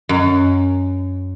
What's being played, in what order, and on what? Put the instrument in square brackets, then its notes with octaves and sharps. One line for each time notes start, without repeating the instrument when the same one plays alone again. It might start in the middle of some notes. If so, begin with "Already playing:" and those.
[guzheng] F#2